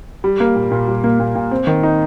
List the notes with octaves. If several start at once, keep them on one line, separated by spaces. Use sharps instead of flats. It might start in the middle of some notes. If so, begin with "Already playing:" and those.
G3
A#3
A#2
A#2
G3
A#3
A#2
A#2
C4
D#3
D#4